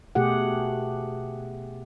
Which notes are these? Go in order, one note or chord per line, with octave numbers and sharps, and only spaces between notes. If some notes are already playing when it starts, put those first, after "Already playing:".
B2 A3 G4 G#4 F#5